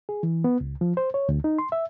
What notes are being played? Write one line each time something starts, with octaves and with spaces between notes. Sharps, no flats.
G#4
E3
B3
C#2
F3
C5
C#5
D2
D#4
C6
E5